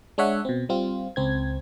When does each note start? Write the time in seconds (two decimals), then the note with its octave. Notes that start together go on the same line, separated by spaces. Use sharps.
0.18 G#3 D4 C#5 E5 F#5
0.45 B2 C4
0.69 G3 C4 F4
1.16 C#2 C4 G#6